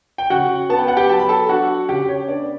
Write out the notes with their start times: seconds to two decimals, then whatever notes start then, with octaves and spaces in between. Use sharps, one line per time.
0.18 G5
0.30 C#3 F#4 F#5
0.70 B3 A5
0.79 G5
0.88 F#5
0.97 G4 G5
1.09 F#3 A5
1.19 B5
1.29 A4 A5
1.49 D4 F#4 F#5
1.89 C#3 G4 G5
2.09 C#5
2.28 B3 D4 D5